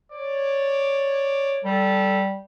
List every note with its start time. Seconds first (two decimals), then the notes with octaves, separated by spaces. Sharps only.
0.13 C#5 D5
1.64 G3 A4